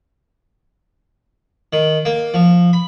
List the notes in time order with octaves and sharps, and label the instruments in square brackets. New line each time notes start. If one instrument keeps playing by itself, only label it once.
[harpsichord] D#3
A#3
F3
B5